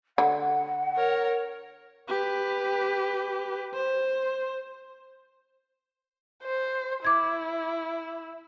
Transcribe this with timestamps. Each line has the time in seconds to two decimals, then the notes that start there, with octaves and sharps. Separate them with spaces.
0.18 D3 F#5
0.96 A#4 C#5
2.09 G4 B4
3.74 C5
6.44 C5
7.05 E4 D6 G#6